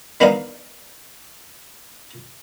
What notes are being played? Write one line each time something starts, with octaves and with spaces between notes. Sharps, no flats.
D#3 B3 D4 D#4 F5 D#6